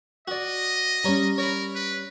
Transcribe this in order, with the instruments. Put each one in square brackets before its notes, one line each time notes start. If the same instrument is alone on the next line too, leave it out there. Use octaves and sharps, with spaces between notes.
[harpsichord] F#4 D5 [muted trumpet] D#5
[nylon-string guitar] G3 C#4 [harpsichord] C#5 A#5
[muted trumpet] A#4 [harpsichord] C#5 B5
[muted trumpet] B4